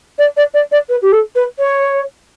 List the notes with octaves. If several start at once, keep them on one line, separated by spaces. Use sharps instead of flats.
D5
D5
D5
D5
B4
G4
A4
B4
C#5